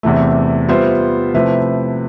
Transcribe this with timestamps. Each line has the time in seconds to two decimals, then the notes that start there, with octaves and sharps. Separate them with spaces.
0.03 E2 C3 E3 A3
0.69 G3 B3 F4 C5 E5
1.34 C3 F3 A3 E4 B4